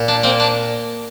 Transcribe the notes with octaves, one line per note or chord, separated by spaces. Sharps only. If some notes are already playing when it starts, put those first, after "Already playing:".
Already playing: A#2
D4
A#3 C4
D4